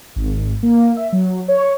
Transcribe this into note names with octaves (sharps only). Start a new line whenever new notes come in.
G#1
A#3
E5
F#3
C#5